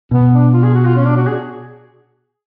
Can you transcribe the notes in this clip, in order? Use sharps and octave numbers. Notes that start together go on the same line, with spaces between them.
B2 B3
D4
F4
G#4
F#4
F4
C#4
D4
F#4
G#4